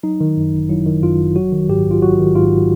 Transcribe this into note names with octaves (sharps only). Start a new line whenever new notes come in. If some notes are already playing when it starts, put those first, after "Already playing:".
F#3 D#4
D#3
F#2
G1
F#3 E4
D#3
F#2 F4
G1
F#3 F#4
D#3
G#2 G4
A#1
F4
F#3 F#4
D#3
G#2 F4